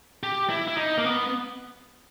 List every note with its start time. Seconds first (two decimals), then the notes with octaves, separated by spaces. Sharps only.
0.23 G4
0.49 E4
0.68 E4
0.77 D#4
0.97 A#3
1.04 B3